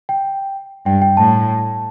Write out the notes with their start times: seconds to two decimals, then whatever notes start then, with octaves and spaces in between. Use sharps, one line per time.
0.09 G5
0.86 G2 G5
1.02 G5
1.17 A2 A5